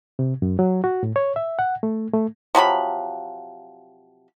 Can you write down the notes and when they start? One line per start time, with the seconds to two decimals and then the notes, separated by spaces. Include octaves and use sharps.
0.19 C3
0.42 F#2
0.59 F#3
0.84 F#4
1.03 A2
1.16 C#5
1.36 E5
1.59 F#5
1.83 A3
2.13 A3
2.55 C3 F3 F#3 B5